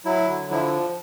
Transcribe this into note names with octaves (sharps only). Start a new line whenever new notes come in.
F#3 E4
D3
F3 E4